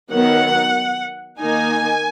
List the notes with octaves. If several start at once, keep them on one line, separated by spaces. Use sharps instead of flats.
D#3 F#3 B3 F#5
D#3 A#3 D#4 G#5